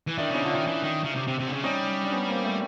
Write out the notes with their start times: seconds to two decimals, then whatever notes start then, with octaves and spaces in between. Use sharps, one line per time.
0.07 E3
0.18 D#3 D4 E4
0.30 C#3 C#4 D#4
0.42 D3 F4
0.50 D#3 D4 E4
0.67 E3
0.83 D#3
1.04 C#3
1.15 C3
1.27 C3
1.39 C3
1.48 D3
1.51 C#3
1.63 G3 C#4 D#4
2.05 D4
2.12 B3 C#4
2.28 A#3 C4
2.44 A3 B3